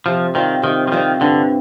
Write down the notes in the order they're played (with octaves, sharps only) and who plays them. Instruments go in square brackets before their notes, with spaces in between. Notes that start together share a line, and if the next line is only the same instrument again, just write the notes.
[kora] C3 [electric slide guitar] F3
[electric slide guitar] D#3 [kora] G3 C4 F4
[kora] C3 [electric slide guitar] D#3
[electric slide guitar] F3
[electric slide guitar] D#3 [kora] G3 C4 F4
[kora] G2 [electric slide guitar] D3